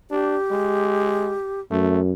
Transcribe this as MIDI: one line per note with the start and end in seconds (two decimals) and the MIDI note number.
0.11 0.37 62
0.11 1.60 67
0.51 1.35 56
1.71 2.14 42
1.71 2.00 57